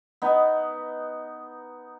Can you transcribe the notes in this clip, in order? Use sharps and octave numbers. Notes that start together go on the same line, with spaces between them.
B3 D#4